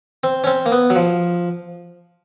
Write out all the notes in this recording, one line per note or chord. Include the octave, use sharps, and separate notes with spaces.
C4
C#4
C4
A#3
B3
F#3
F3